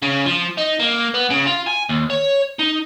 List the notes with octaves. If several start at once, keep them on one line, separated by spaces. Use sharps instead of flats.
C#3
F3
D#4
A#3
B3
C#3
F4
G#5
D#2
C#5
D#4